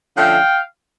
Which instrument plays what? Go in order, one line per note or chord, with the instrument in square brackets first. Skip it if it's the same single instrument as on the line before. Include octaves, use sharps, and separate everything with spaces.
[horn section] D3 F3 A3 C#4 F5 G5